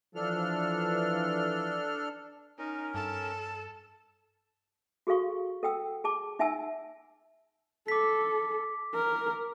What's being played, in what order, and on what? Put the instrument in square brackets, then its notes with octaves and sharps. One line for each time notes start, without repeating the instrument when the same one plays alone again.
[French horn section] E3 F3 [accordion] D4 A4 F6
[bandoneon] C#4 A#4 [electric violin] D#4
[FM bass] G2 [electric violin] A4 [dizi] A5
[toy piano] F#4 G#4 A4 F5 C#6
A4 F#5 G5 E6
G#4 A5 D6
D#4 E5 F#5 G#5 A5 E6
[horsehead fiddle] A4 [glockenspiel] D6 B6
[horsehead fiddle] A#4